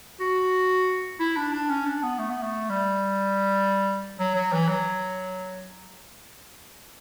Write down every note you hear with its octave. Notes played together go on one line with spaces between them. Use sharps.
F#4
E4
D4
D4
C#4
D4
B3
A3
B3
A3
G3
F#3
F#3
E3
F#3